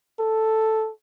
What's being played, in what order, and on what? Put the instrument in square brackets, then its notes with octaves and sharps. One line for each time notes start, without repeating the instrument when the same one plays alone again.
[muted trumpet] A4